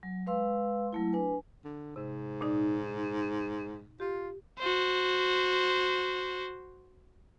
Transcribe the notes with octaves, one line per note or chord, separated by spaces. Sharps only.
F#3
G#3 B4 F5 C6 E6
F#3 A3 E4
D4 B4 G#5
D3
G#2 C3
A#2 D#4 D5
F4 G4
F#4 C5